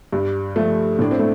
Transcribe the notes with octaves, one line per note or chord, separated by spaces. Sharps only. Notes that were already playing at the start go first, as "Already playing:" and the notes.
G2 G3
F3 A3
A2 D4
C4
A3